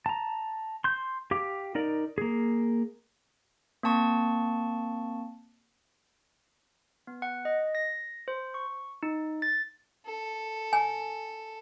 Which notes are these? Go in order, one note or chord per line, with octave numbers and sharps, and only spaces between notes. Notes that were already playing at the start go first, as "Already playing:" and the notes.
A5 A#5
C6 G6
G4 F5 D6
D#4 A#4 D5
A#3 G#4
A#3 C4 A5 C#6
B3
F#5
D#5
A#6
C5
C#6
D#4
A6
A4
G#5